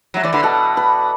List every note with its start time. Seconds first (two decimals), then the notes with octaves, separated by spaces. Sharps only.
0.14 F#3 E5
0.23 E3 D5
0.33 D3 B4
0.43 B2 A4
0.77 B4